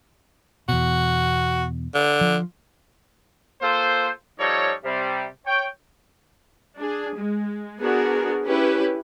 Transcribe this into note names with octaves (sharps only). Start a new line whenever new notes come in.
E2 B2 F#4
D3
F3
A#3 F4 A4 C5
F3 G3 D#4 A4 C#5
C3 G3
C#5 G5
D4 G#4
G#3
B3 D4 F#4 G#4 A#4
C#4 E4 G4 B4